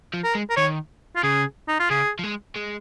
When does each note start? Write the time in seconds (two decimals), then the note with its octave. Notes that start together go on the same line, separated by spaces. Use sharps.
0.13 F3
0.24 A#4
0.35 G#3
0.50 A#4
0.57 D#3 C#5
1.16 F4
1.23 C#3 G#4
1.68 D#4
1.79 F4
1.90 C#3 G#4
2.19 F3
2.24 G#3
2.56 G#3